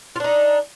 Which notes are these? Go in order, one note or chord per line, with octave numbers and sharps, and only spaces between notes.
D4 D#4 F4